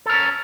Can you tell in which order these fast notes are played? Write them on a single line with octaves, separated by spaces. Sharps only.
A4 A#4 C#4